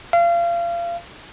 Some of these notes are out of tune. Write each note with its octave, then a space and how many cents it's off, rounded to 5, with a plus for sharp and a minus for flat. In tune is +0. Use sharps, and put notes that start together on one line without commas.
F5 -30